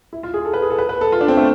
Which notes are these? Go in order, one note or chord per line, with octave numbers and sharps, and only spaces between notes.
E4
F4
G#4
A4
B4
G#4
A4
B4
B4
A4
F4
D4
C4
A3